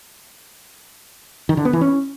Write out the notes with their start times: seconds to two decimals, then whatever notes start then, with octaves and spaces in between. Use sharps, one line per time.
1.49 D#3
1.57 D3
1.65 B3
1.73 E3
1.81 C#4